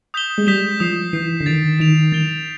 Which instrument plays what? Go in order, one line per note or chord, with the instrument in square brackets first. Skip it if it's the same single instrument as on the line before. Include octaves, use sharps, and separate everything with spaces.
[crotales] D#6 G6 B6 E7 G7
[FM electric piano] G#3
[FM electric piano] G3 [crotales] D#6 G6 B6 E7 G7
[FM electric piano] F3 [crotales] D#6 G6 C7
[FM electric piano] E3 [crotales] D#6 G6 C7
[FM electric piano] D3
[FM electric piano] D#3 [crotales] A6 D7 F7
[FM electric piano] D#3 [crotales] A6 D7 F7
[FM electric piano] D#3 [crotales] A6 D7 G7